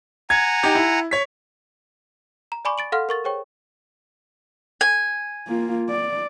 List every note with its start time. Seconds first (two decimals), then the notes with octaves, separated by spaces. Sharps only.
0.30 F#5 G#5 A#5 G#6
0.63 D#4 G4
0.75 E4
1.11 C#5 B6
2.52 A#5
2.65 D5 G#5 B5 C#6 D6
2.78 A6 D7 F#7
2.92 A4 F5 F#5 C6 F6
3.09 A#4 C#6 A6
3.24 G#4 C5 C#5 G5 C#6
4.81 G#5
5.48 A#3 F4
5.89 D5